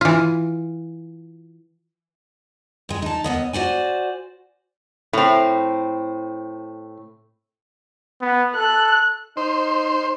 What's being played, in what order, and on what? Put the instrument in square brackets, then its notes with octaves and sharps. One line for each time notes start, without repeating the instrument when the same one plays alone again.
[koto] E3 F4
[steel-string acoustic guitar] G2 G#3
D#4 A5
D#2 B3 D#5
F#4 C5 D5 G#5
[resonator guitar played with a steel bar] A2 C4
[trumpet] B3
[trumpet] A4 [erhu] F#6
[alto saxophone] D#4 [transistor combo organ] C5